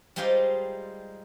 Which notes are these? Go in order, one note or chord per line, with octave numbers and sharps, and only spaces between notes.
G3 G#3 D#4 F4 C5 D5